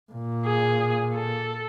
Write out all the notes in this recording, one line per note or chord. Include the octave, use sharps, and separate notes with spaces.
A#2
G#4
A4